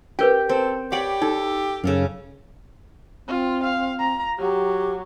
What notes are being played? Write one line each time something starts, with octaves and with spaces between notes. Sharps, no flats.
C#4 G4 A#4 B4 G5 G6
C4 A4
G4 C#5 D5 F#5 B5
D#4 A4
F#2 C#3 A4 F5
C4 F4
F5
A#5
F#3 G4